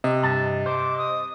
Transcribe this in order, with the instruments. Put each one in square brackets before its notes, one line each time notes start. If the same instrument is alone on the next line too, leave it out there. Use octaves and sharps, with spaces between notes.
[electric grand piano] C3 [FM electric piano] D#5
[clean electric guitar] G2 A5
[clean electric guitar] C5 [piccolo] D6
[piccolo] D#6